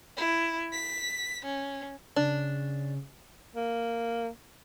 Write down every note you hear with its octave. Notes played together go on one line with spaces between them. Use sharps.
E4
B6
C#4
C#3 D4
A#3